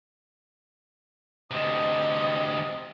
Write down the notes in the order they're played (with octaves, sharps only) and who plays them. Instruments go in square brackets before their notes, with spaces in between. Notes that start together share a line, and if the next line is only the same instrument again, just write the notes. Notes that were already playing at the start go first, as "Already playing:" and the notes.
[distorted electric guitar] D2 C3 [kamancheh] D#5